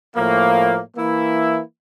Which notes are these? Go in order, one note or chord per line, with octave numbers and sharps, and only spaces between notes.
A2 F3 A#3
E3 A#3 E4